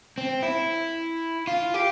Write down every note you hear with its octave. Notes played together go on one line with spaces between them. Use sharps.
C4
E4
F4
G4